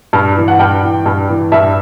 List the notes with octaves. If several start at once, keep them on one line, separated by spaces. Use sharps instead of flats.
G2
E3
F#5
G2 G5
E3
G2
E3
G2 E5